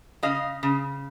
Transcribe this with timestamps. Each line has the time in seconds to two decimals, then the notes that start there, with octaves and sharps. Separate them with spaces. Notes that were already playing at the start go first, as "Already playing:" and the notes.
0.23 C#3 D#5 F5
0.63 C#3